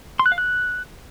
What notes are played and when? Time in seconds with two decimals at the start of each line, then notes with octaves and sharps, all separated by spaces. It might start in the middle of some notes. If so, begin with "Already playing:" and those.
0.19 C6
0.26 F#6
0.32 F5
0.38 F#6